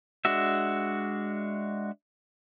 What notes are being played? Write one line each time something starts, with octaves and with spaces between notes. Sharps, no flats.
G#3 D4 F#4 E5